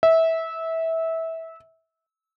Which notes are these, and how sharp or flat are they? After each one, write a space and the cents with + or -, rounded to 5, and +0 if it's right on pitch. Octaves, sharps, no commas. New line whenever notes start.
E5 -20